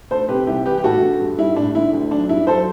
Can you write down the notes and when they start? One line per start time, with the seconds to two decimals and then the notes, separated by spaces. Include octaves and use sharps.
0.11 D2 A4 C5
0.29 C3 G4 B4
0.47 C2 E4 G4
0.65 E3 G4 B4
0.78 G4
0.84 A2 F#4 A4
1.02 D3
1.20 G2
1.38 G3 E4
1.56 A2 D4
1.74 D3 E4
1.93 D2
2.11 F#3 D4
2.29 G2 E4
2.47 F#3 A4 C5